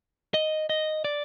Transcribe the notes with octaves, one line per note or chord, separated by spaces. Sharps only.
D#5
D#5
D5